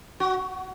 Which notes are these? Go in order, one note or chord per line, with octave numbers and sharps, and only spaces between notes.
F#4